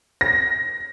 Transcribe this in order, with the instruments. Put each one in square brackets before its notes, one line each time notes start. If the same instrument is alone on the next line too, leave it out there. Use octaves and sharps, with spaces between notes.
[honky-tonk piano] A#6